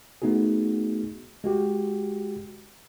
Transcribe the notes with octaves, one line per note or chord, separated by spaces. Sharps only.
A3 B3 D#4 F#4 G#4
G#3 F#4 G4